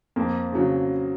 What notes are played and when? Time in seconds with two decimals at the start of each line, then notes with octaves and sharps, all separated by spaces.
0.16 F2 A#3
0.52 C#3 F#3